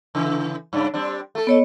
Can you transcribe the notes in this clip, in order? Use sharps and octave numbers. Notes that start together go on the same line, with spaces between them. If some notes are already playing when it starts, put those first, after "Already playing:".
C#3 E3
G2 C#3 D4
G3 C4 D4
A3 A4
B3 C#5 D#5